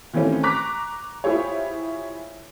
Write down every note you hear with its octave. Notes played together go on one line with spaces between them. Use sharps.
D#3 E3 A3 C4 C#4
A#5 C#6 D6 F#6 B6
E4 F4 G4 G#4 C5 C#5